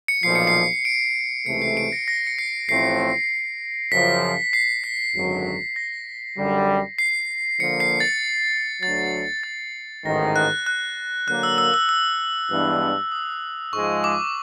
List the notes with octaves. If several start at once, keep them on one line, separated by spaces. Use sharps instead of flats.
C#7
B1 A#2 F3 C7
C#7
C7
D7
C#2 C3 E3 A3 C#7
C7
D7
A#6
A#6
C#7
C7
A1 A2 F3 A3 C4 C7
F#2 C#3 F3 B6
C7
B6
G#1 F#2 D3 F#3
A#6
F#2 D3 G3
C7
D3 F3 A#3 C#7
C7
A6
D2 D3 F#3 A6
A6
A1 G#2 D#3 A#6
F#6
F#6
D3 F#3 A#3 F#6
E6
E6
E6
E6
G2 E3 G#3 B3 D4
D#6
G#2 F3 G#3 C#6
D6